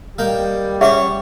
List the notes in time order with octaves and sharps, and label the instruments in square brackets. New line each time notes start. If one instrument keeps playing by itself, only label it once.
[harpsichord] D#3 A#3 G5 [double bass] G3
[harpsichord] C#4 C5 C#6 [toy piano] G#4 E5 F#5 [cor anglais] C#5